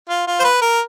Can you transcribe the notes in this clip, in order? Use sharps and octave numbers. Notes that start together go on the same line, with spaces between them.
F4
F4
C5
B4
A#4